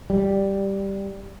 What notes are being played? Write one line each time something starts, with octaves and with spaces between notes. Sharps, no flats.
G3